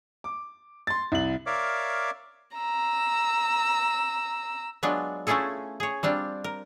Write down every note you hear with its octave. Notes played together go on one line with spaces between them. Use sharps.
D6
C6 A6
C2 F#7
A#4 C#5 D5 E5 F5 D6
A#5 E6
F#3 G#3 B3 D4 F4
A3 C#4 E4 F4 G#4 A4
G#4 C#5
G3 C4 D4 F4
A#4